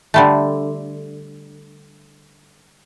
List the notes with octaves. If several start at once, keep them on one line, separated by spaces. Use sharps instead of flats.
D3 G3 A3